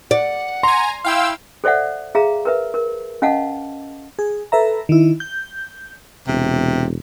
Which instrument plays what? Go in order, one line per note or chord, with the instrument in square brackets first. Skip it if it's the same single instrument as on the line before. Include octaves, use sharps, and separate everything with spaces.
[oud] D5 [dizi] F#5
[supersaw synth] G#5 A#5 [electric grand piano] C6
[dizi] E4 [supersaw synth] F5 G5 E6
[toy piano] A4 C5 D5 E5 F#5
G#4 E5 F5 A#5
A#4 B4 E5
A#4
C#4 D#5 F5 F#5 A5
[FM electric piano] G#4
A4 B4 E5 A#5
D#3 E4
G6
[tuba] E1 [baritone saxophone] C3